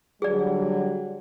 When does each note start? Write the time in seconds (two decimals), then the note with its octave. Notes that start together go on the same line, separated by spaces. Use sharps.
0.22 D3 F#3 G3 G#4 D5